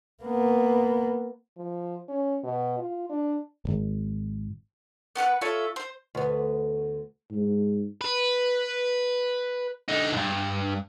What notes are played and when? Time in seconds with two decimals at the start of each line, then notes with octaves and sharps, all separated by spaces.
0.23 A#3 B3
1.57 F3
2.09 C#4
2.44 B2
2.79 F4
3.10 D4
3.65 D1 G#1
5.15 B3 F#4 B4 F#6
5.41 F4 A4 C#5 E5
5.76 C5
6.15 D2 B3
7.31 G#2
8.01 B4
9.88 D3 D#4
10.12 C2 G2